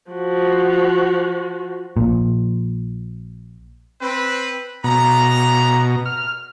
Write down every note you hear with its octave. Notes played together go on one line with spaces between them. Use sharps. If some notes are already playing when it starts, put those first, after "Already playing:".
F3 F#4
A#1 A#2
C4 B4
B2 A#5
F6